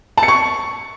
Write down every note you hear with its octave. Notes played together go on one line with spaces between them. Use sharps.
A5
C#7
C#6